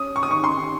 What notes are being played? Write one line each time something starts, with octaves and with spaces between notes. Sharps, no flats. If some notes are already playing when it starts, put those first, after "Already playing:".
Already playing: C#4 D#6
C#6
D#6
D#3 C#6
C6